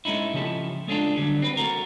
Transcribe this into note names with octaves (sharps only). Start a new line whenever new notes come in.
G#3 A3 C#4 D#4 E4
C#3 F3 C#4 G4 A4
G#3 A3 C#4 D4 F4 A4
D3 F#3 G3
C4 B4
A3 F#4 A#4